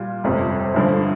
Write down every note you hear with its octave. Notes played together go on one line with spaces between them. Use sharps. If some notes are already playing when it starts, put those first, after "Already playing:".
Already playing: A#2 G3 F4
G1 F2 C3 G3
G1 G2 D3 F3